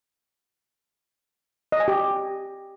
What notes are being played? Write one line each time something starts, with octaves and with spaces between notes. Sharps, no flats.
D#5
G#5
G4